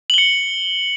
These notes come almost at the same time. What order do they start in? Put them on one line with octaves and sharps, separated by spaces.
F#7 G7 C#7